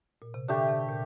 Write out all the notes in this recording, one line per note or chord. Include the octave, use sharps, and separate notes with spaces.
A#2
C3
D3 A3 D4 G4
C3
A#2